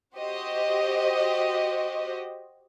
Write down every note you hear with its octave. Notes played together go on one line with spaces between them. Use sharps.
F#4 G4 C5 D#5